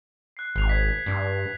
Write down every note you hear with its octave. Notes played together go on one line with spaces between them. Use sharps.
F#6 C7
G#1 C7 F7
G#6 B6
G2